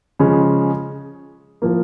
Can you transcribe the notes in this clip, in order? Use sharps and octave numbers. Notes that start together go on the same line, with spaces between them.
C#3 F3 G#3 C#4
A2 F3 A#3